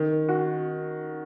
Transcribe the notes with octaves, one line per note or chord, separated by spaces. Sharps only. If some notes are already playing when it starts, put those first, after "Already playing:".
Already playing: D#3
F#4